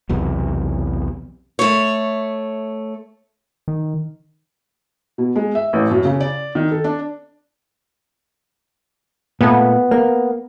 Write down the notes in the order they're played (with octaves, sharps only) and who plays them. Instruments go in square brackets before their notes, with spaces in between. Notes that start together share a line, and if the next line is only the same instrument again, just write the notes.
[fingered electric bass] B1 E2 C3
[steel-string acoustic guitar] A3 C#5
[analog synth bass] D#3
[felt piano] B2
G#3
E5
A1
F#2
C#3
D5
D#3
A4
D4
[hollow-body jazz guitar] A#2 A3 [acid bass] B3
[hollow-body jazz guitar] A#3